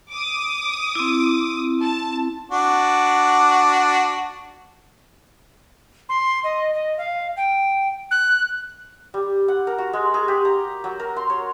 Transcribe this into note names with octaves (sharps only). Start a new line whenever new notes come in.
D6 D#6
C4 E4
A5
D4 F#4
C6
D#5
D#5
F5
G5
F#6
G3
F#5
A#4
F#4
G#3
G#4
G4
A#5
F#3
A#4
C6
C#5